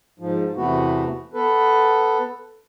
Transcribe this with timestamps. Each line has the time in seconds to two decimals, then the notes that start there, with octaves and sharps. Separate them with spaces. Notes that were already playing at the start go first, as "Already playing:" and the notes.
0.19 G#2 F3
0.56 E2 C3 E3 A3 B3 F#4
1.34 B3 A4 B4